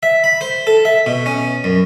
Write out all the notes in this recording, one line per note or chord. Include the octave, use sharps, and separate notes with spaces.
E5
B5
C5
A4
E5
B2
C#4
F#2